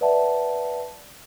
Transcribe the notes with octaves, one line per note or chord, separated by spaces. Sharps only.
B4 D5 E5 F#5 A5